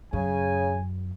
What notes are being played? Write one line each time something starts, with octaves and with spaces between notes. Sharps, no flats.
F#2 C#3 G#5